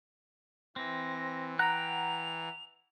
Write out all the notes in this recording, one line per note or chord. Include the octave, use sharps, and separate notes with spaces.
E3 C4 A#6
F#5 G5 A#5 F#6 F7